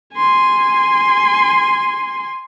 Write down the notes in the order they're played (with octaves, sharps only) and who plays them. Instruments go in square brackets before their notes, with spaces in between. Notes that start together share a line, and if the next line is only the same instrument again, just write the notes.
[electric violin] G#5 C6